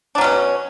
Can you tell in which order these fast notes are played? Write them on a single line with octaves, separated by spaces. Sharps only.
D4 F#3 C#4 B2